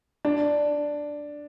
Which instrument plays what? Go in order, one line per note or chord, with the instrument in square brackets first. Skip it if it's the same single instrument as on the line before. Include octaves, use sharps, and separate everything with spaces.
[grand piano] D4